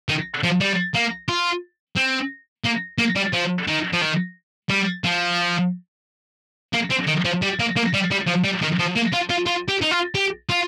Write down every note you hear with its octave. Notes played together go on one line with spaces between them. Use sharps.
D#3
F3
G3
A#3
F4
C4
A#3
A#3
G3
F3
D#3
F3
D#3
G3
F3
A#3
C4
D#3
F3
G3
A#3
A#3
G3
G3
F3
G3
D#3
F3
A#3
F4
F4
F4
G4
D#4
F4
G4
F4